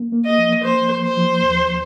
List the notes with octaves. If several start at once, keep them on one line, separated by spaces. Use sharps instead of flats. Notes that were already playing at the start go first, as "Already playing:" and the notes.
Already playing: A#3
A#3
D#5
F3
A#3 C5
F3
C5
F3
D#2